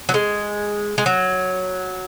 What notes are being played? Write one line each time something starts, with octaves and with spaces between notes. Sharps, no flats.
F#3
G#3
G#3
F#3